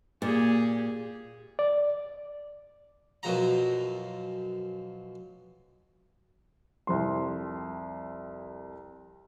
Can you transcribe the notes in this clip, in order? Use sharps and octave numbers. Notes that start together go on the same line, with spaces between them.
A#2 G4 G#4
D5
F#2 B2 F3 A#5
C2 F2 C6